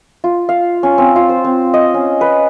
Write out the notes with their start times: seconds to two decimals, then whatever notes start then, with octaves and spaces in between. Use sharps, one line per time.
0.24 F4
0.49 F5
0.83 C#4
0.98 C4
1.16 F4
1.29 C5
1.45 C4
1.74 D#5
1.94 C#4
2.21 B4